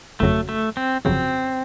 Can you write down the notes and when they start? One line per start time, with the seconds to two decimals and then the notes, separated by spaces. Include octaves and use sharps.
0.20 G1 F2 C#3 F#3 A3
0.49 A3
0.77 C4
1.05 G1 F2 C#3 F#3 C4